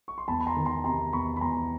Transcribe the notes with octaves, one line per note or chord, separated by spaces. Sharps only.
C#6
C6
E2 A5 B5
B5
A#5 C6
D#3
A#5 C6
C3 A#5 C6
E2 B5 C#6
B5
E2 A#5 C6